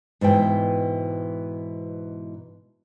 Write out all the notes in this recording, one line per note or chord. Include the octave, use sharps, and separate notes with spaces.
G#2 B2 E3 G5